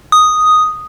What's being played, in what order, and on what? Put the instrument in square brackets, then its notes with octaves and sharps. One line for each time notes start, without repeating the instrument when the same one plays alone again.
[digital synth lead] D#6